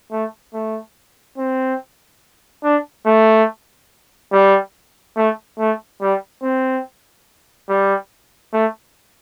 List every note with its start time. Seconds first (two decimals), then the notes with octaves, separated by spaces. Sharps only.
0.12 A3
0.54 A3
1.38 C4
2.64 D4
3.06 A3
4.33 G3
5.16 A3
5.59 A3
6.01 G3
6.43 C4
7.69 G3
8.53 A3